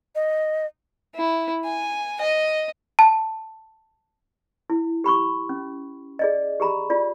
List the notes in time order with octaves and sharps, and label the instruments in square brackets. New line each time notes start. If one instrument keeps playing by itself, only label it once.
[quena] D#5
[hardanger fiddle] E4
G#5
D#5
[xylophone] A5
[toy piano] E4
G4 B5 C#6 D6
C#4
G#4 D5 D#5
G4 G#4 A#5 B5
F4 D5